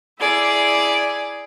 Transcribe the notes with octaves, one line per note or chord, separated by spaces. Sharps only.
E4 G#4 D5